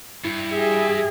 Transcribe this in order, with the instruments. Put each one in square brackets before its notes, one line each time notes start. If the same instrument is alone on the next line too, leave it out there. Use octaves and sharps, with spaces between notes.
[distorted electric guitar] G2 [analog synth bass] E4
[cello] G4 G#4 [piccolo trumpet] E5